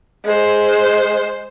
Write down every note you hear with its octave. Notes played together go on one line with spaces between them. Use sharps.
G#3 C5